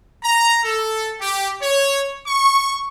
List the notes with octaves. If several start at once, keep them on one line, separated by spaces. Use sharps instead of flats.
A#5
A4
G4
C#5
C#6